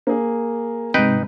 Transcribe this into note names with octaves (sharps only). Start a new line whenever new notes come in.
A#3 G#4
G#2 C3 D#4 B4 G5